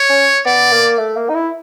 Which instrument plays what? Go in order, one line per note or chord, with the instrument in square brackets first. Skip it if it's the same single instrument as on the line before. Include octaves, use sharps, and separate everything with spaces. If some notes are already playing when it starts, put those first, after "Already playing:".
Already playing: [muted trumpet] C#5
[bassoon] C#4
[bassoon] B3 [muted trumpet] D5
[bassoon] A#3
A3
A#3
D#4
E4